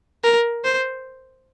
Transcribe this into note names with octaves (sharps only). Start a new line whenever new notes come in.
A#4
C5